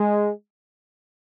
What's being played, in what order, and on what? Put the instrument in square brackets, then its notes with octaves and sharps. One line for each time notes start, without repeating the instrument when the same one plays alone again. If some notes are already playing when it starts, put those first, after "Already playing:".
Already playing: [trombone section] G#3